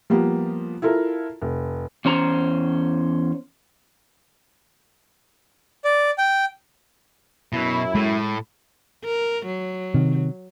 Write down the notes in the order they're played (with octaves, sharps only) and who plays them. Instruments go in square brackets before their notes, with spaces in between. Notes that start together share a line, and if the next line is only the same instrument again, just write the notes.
[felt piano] F3 G3 A#3 B3
E4 F4 A4 A#4
F1
[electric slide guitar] E2 C#4 C5 A#5
[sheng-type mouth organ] D5
G5
[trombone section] F#2 E4 [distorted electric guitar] B2
[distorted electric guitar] A2 [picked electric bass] G#3
[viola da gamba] A#4
F#3
[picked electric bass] C3 D#3